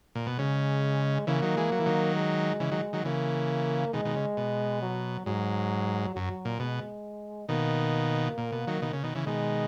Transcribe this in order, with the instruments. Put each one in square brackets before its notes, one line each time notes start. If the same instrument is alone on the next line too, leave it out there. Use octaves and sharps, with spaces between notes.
[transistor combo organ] A#2
B2
[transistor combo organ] C#3 [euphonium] G#3
[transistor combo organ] C#3 E3 [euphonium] A#3
[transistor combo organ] D#3 F#3
E3 G#3
F#3
E3
D#3 F#3
[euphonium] G#3
[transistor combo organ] C#3 E3
D#3 F#3
D#3 F#3
[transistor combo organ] C#3 E3 [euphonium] A#3
[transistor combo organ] B2 D#3 [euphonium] G#3
[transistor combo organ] B2 D#3
C#3
B2
[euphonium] F#3
[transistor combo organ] G#2 [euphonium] F#3
[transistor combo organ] F#2 [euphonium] F#3
[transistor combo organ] A#2
[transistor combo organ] B2 [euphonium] G#3
[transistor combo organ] B2 D#3 [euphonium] A#3
[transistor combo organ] A#2
B2
D#3 F#3
B2 D#3
C#3
B2 D#3
C#3 E3
[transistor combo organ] B2 D#3 [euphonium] G#3